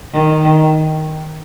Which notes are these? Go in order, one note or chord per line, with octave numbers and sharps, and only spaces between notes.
D#3